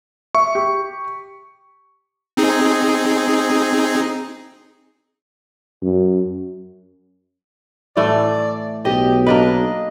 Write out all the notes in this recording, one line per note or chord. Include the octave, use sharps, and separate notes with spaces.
E5 C#6
G4
C4 D#4 G#4
F#2
A2 E3 A3 D5
B1 G4 D#5
A#3 D4 B4 D#5